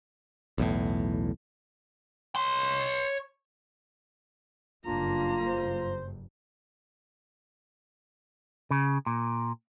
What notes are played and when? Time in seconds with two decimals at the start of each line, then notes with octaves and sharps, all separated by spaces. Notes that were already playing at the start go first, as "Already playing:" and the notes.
0.58 B1 E2 A2
2.36 C#5 C6
4.86 F#1 G2 A#3 D4 F4 A#5
5.46 C5
8.71 C#3
9.06 A#2